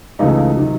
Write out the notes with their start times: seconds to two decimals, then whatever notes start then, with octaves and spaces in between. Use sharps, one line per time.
0.19 C#2 C#3 E3 A3 D#4
0.56 C3 D#3 F#3